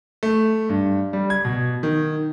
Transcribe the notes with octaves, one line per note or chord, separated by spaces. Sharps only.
A3
G2
G3
G#6
B2
D#3